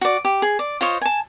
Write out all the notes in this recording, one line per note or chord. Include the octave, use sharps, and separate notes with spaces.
F#4 D5
G4
G#4
D5
F4 C5 C#5 D#5
G#5 A5